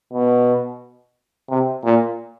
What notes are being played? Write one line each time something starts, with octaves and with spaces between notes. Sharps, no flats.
B2
C3
A#2